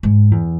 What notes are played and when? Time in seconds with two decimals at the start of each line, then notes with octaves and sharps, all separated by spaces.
0.03 G#2
0.31 E2